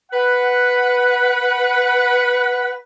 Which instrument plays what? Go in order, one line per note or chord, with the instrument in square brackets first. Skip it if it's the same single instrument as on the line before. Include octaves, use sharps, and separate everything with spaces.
[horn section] B4 F#5